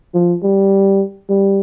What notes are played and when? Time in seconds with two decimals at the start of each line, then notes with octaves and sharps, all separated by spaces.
0.14 F3
0.44 G3
1.30 G3